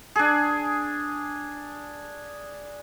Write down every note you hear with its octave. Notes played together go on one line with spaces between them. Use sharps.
D4 G#4